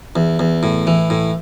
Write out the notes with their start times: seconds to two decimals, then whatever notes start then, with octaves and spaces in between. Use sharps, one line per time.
0.16 E2
0.39 E2
0.63 A2
0.87 E3
1.10 A2